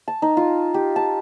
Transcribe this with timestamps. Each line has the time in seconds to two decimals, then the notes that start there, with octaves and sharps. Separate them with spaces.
0.08 A5
0.22 D#4
0.37 F4
0.74 G4
0.96 A5